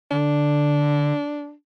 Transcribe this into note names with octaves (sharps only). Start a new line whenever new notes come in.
D3 D4